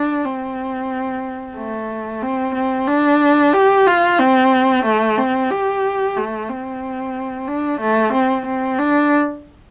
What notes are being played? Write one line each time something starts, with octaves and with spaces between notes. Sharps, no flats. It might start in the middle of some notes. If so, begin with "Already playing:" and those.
Already playing: D4
C4
A3
C4
C4
D4
G4
F4
C4
A3
C4
G4
A3
C4
D4
A3
C4
C4
D4